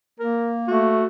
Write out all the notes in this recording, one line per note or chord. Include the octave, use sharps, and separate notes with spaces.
A#3 A#4
A3 F#4